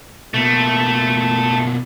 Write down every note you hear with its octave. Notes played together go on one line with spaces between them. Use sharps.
B2 A3 A#3